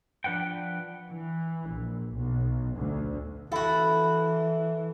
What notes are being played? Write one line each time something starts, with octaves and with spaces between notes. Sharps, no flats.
F3 D4 B4 F#5 G5
E3
A#1
B1
D2
E3 E4 F#4 A4